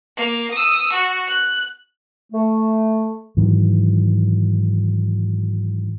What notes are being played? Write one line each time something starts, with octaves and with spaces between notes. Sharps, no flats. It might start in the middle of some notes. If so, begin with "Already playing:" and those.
A#3
D#6 E6
F#4
F#6
A3
G#2 D#3 E3 F#3